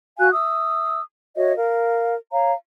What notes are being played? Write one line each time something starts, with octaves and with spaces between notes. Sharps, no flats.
F#4 F5 G#5 F#6
E5 D#6 E6
F#4 C#5 D#5 E5
A#4 F5
C#5 F5 A#5